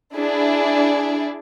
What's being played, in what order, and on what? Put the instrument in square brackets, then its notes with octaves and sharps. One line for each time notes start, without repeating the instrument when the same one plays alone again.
[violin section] D4 E4 G#4 D5